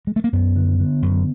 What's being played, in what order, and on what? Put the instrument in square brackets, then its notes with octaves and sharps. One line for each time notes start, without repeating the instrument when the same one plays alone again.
[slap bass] G#3
A3
A#3
F#2 B3
D3
D3
F#2